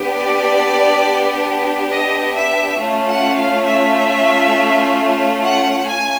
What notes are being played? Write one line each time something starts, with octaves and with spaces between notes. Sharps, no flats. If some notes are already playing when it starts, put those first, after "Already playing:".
Already playing: B3 D4 G4
D5
D#5
E5
A3 C#4 F4
F#5
F5
E5
F#5
G#5